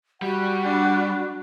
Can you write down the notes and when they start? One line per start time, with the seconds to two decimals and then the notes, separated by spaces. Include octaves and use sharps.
0.22 G3 F#4 F#5
0.62 D4